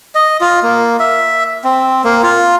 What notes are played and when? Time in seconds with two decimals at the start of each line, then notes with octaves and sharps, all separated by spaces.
0.15 D#5
0.41 F4
0.63 A#3
1.00 E5
1.64 C4
2.04 A#3
2.23 F4